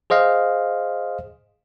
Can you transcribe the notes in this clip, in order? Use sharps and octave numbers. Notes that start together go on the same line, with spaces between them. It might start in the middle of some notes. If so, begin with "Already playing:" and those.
G#4 C5 D#5 F5